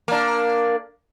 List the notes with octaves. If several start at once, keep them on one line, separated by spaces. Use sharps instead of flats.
A#3 D4